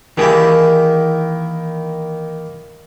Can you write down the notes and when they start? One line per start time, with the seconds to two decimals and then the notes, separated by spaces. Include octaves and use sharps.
0.17 D#3 E3 A#3 E4 G4 G#4